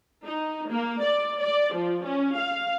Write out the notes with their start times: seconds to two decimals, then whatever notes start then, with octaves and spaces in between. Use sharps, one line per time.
0.24 D#4
0.69 A#3
1.02 D5
1.40 D5
1.73 F3
2.06 C#4
2.37 F5